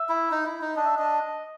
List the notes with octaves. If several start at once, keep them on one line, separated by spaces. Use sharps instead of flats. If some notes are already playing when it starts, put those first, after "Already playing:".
Already playing: E5
E4
D#4
E4
D#4
D4 D#5
E5
D4 D#5